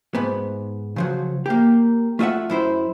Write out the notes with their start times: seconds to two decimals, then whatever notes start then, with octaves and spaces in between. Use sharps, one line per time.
0.15 G#2 B3
0.96 C#3 F3 F#3
1.46 A#3 G4
2.19 A3 F4 D#5 E5 F#5
2.50 F#2 E4 C5